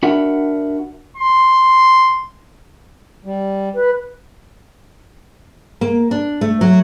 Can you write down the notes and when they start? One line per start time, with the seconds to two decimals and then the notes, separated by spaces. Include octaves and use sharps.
0.03 D4 F#4 A#4 E5 F#5 B5
1.17 C6
3.25 G3
3.74 B4
5.81 A#3
6.11 D4
6.41 A3
6.61 F#3